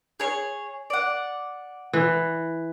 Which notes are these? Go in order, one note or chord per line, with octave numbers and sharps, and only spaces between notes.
G#4 C#5
D5 F#5
E3